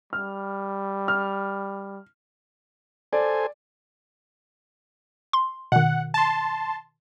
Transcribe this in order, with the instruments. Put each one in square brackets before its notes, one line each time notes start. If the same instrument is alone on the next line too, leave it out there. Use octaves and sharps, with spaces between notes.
[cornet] G3 [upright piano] F6
[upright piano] F6
[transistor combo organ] A4 C5 G#5 [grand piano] D5
[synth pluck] C6
[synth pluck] B2 D#3 [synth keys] F#5
[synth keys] A5 C6